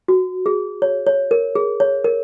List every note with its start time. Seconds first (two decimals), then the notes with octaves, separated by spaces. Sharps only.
0.08 F#4
0.46 G#4
0.82 C#5
1.07 C#5
1.31 A#4
1.55 G#4
1.80 C#5
2.04 A#4